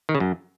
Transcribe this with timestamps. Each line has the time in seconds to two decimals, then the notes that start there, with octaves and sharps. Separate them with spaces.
0.09 D#3
0.15 C#3
0.20 F#2